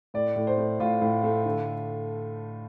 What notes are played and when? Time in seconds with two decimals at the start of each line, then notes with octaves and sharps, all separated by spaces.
0.14 A2 D5
0.36 A2
0.47 C5
0.58 A3
0.80 A2 F4
1.02 A2
1.24 A3
1.45 D3